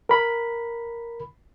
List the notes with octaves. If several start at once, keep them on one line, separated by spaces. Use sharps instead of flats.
A#4 B5